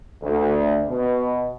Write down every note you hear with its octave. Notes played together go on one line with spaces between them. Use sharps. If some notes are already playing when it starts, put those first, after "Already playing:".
D2
B2